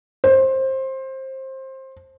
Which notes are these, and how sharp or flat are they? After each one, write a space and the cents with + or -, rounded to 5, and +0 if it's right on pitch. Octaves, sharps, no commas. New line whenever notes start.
C5 +20